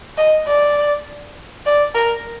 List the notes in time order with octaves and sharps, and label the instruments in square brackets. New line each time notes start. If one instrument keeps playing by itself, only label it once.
[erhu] D#5
D5
D5
A#4